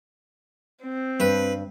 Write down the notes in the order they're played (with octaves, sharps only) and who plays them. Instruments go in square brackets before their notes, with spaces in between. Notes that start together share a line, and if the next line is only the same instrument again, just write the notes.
[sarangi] C4
[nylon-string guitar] G2 [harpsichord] B4